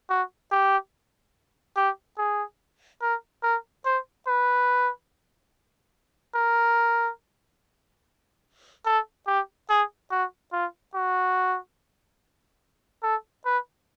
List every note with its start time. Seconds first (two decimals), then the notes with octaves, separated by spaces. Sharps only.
0.10 F#4
0.52 G4
1.77 G4
2.18 G#4
3.02 A#4
3.43 A#4
3.85 C5
4.27 B4
6.35 A#4
8.86 A4
9.27 G4
9.70 G#4
10.11 F#4
10.52 F4
10.94 F#4
13.03 A4
13.45 B4